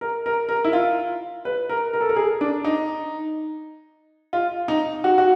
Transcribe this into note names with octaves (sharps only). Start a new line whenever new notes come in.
A#4
A#4
A#4
E4
F4
B4
A#4
A#4
A4
A#4
G#4
D4
D#4
F4
D#4
F#4
F#4